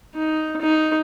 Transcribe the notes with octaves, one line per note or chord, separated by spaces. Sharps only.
D#4
D#4